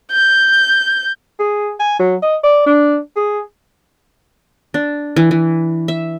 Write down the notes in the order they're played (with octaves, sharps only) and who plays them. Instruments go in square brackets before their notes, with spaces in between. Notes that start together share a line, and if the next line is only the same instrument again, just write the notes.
[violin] G6
[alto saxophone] G#4
G#5
F#3
D#5
D5
D4
G#4
[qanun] D4
E3
E3
E5